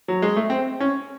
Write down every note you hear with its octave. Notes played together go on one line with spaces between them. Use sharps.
F#3
G#3
A3
C4
C#4